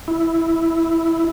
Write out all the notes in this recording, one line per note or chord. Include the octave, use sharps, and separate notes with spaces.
E4